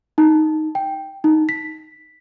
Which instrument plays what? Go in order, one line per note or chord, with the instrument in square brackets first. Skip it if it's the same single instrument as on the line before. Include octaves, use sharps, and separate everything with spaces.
[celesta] D#4
G5
D#4
B6